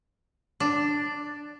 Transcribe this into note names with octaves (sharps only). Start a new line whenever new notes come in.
D4